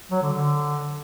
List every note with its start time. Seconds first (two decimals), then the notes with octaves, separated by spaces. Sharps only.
0.11 F#3
0.22 D3
0.33 D3